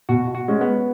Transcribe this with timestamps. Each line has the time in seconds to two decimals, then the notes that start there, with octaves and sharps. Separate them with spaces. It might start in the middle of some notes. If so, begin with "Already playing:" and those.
0.09 B2 F#4
0.35 F#4
0.48 G#3 C#4
0.61 B3